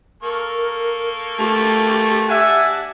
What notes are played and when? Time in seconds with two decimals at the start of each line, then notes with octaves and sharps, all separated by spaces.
0.23 A#3 A4 A#4 C#6
1.39 A3 G4
2.29 D4 F#4 E5 F#5 G#5 A5